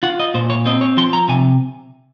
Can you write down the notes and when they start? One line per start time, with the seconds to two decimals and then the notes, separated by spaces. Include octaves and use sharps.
0.03 F4 F#5
0.20 D#5
0.34 A#2 C5
0.50 C#5
0.66 C4 D#5
0.81 C#5
0.97 F3 C6
1.13 A#5
1.29 C3 G#5